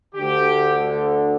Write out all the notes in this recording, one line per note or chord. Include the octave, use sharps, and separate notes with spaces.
D2 D3 G4